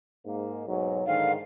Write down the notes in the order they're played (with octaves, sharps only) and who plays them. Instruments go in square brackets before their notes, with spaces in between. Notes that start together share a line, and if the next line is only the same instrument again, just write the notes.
[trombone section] G#2 A#3
B1 G#2 F#3
[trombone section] G#2 D3 D#3 [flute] F5